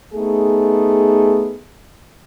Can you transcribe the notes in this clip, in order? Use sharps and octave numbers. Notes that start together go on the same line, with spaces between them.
A3 B3 D#4 G#4